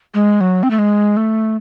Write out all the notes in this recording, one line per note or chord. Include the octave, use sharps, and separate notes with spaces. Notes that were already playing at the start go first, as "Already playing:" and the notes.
G#3
F#3
C4
A3
G#3
A3